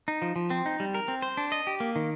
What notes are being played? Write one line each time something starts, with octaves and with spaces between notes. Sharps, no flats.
D#4
F3
F3
C4
D#4
G3
A#4
C4
C5
D4
D#5
G4
A#3
D#3